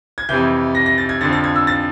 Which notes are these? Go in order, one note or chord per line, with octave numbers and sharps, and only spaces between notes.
G#6
F2 C3 E3 G6
A#6
A#6
A6
G#6
F2 D3 F3 A6
A6
G#6
E6
A6